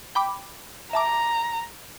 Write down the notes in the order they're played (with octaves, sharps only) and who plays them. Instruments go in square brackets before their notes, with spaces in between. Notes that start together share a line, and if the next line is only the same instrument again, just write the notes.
[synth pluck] G5 B5 D6
[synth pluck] E5 A5 D6 [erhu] A#5